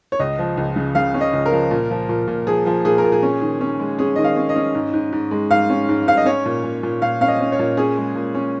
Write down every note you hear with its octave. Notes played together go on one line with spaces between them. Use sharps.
C#5
C#2 D#5
F3
C#2
C#3
C#3 F5
C#4
D#5
C#2
A#4
F3
A#2
F3
A#2
A#2
F3 G#4
F3
A#2 G#4
A#4
A#2
G#4
C#4
D#3
C#4
G#3
C#4 G#4
D#3 D#5
F5
C#4
D#5
C#4
G#2
G#2
G#2
G#3
G#2 F5
C#4
G#2
G#2 F5
D#5
C#4 C#5
A#2
A#2
A#2
A#2 F5
C#4 F5
D#5
C#4
C#5
A#2
C#4 G#4
G#3
A#2
C#4